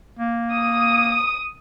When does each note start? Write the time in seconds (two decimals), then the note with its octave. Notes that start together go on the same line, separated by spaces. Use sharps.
0.19 A#3
0.52 D#6